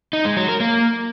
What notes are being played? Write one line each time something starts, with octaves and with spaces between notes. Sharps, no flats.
D#4
G#3
F#3
A#4
A#3